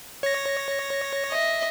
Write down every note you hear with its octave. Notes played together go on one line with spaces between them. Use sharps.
C#5 A#6
D#5 E5